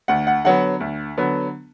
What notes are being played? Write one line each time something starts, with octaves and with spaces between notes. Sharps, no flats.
D2 F#5
F#5
D3 F#3 B3 F#5
D2
D3 F#3 B3